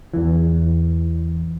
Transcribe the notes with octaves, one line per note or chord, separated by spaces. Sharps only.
E2 E3